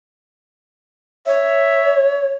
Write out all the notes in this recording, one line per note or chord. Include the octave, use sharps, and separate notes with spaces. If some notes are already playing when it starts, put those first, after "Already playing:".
C#5 E5